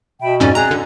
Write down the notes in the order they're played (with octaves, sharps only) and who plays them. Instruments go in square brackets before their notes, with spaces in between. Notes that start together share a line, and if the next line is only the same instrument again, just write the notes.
[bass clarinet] B2 [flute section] E5 G5 B5
[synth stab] F2 G#2 C#4 [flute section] D5
[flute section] G#4 G#5 F#6 [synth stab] A#5
[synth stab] D3